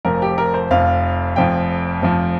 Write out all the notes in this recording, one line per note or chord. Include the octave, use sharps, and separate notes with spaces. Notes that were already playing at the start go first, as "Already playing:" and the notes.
F1 F2 F3 A#4
G4
A#4
C5
F1 F2 F3 F5
F1 F2 F3 G5
F1 F2 F3